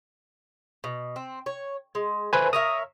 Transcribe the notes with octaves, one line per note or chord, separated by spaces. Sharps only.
B2
C4
C#5
G#3
D3 A3 B4 C5 G#5
A#4 C#5 E5 D#6